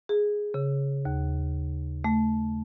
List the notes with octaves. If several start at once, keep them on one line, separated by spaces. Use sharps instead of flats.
G#4
C#3
D#2
A3